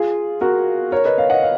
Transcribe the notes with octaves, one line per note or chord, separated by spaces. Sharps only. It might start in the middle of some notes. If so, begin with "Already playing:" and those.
Already playing: F4 G#4
F#4 A#4
A#4 C#5
B4 D#5
C#5 F5
D#5 F#5
F5